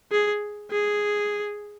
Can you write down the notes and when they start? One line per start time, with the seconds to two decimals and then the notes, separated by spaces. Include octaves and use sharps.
0.12 G#4
0.71 G#4